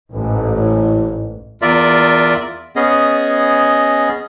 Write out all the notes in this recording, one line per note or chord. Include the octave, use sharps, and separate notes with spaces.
A1 G#2
A2
E2 F4 A#4 D5 E5
B3 C#4 G#4 D#5